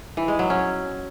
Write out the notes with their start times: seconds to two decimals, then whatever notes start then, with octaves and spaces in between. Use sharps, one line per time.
0.17 E3
0.28 G#3
0.39 F#3
0.50 C#4